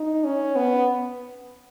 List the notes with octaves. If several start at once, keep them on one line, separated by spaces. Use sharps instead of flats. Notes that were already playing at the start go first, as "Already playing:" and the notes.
Already playing: D#4
C#4
B3